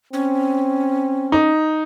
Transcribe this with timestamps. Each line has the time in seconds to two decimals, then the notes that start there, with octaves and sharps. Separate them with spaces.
0.13 C4 C#4
1.32 D#4